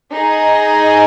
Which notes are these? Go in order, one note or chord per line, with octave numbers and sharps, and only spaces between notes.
D#4 G#4 D#5